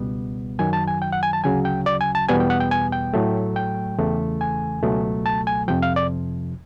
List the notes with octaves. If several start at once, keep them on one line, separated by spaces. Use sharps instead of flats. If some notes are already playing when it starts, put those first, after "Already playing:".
Already playing: C#2 B2 G3 B3
F#2 D#3 F#3 G#5
A5
G#5
G5
F#5
G#5
A5
D2 C#3 F#3 G#5
G5
D5
G#5
A5
E2 B2 G3 B3 G#5
G5
F#5
G5
G#5
G5
A2 F#3 A3
G5
E2 C#3 E3 A3
G#5
C#2 B2 F#3 A3
A5
G#5
F2 C3 F3 G5
F5
D5